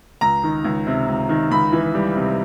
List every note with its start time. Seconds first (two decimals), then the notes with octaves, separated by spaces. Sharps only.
0.21 C#2 A#5
0.43 D#3
0.64 C#2
0.87 C3
1.08 C#2
1.29 D#3
1.51 C#2 B5
1.72 E3
1.95 G3
2.16 C3